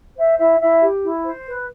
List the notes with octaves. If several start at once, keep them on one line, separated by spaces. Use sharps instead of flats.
C5 E5
E4 E5
E4 E5
G4
E4
C5
B4